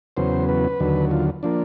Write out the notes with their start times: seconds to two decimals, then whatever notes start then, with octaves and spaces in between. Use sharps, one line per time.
0.17 E2 C#3 F#3 B3 C5
0.49 B4
0.80 D#2 D3 F#3
1.11 F4
1.43 F3 A#3 D4